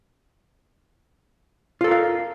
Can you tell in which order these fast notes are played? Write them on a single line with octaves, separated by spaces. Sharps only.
F4 A4 A#4 F5